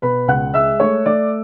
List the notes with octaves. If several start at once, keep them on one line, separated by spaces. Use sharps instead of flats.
B2 B4 B5
C#2 F#5 F#6
G#3 E5 E6
A3 C#5 C#6
A3 D5 D6